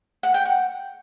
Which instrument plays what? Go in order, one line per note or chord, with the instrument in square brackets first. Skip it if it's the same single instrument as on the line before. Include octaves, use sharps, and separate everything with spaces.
[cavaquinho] F#5
G5
F#5